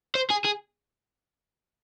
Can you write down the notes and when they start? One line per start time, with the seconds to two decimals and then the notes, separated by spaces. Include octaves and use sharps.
0.15 C5
0.30 G#4
0.45 G#4